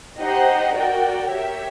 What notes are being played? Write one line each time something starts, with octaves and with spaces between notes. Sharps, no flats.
D#4 G4 C5 D#5 F#5
F#4 A#4 D5 G5
G4 A#4 C#5 E5